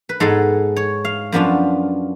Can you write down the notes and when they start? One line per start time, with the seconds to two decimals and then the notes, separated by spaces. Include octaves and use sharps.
0.09 B4
0.20 G#2 G#3 B3 A4
0.76 C#5
1.05 F5
1.32 F#2 F3 B3 D4 F4